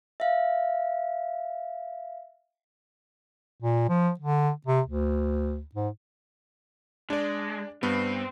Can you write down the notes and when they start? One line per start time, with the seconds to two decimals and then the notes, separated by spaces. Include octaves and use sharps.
0.20 E5 F5
3.61 A#2
3.89 F3
4.20 D3
4.67 C3
4.87 D2
5.75 G#2
7.10 G#3 D4 D5
7.83 G2 B3 C4